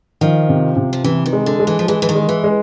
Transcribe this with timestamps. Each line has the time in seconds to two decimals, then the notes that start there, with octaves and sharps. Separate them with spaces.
0.21 D#3 F3
0.49 C3
0.77 C3
0.93 F3
1.04 C3 E3
1.26 D#3
1.33 G#3
1.46 D3
1.59 G#3
1.67 E3
1.79 F3
1.88 E3 G#3
2.02 E3
2.09 D#3
2.15 G#3
2.29 E3
2.44 G#3